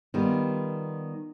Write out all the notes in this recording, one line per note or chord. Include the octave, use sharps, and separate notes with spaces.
D#3 G3 B3 F4